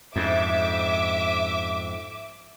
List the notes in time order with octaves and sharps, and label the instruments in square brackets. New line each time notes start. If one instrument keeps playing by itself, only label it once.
[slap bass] F2 G#2 [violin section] E5 D6